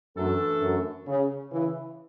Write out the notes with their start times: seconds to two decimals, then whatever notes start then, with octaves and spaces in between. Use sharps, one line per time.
0.16 F#2 E3 A3 D4 A4
0.62 F#2
1.06 C#3
1.52 C#3 E3